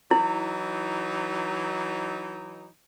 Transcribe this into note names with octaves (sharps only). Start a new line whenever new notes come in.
E3 F#3 D#4 E4